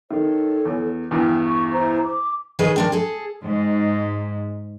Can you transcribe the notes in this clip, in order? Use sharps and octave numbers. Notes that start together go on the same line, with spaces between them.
D#3 A4 C#5
E2
E2 G2 E3 G5 F6
C#6
E4 C5 A#5
D6
D#3 G#4 B4 C#5 D#5
C4 D4 A#4
G#4 A4
G#2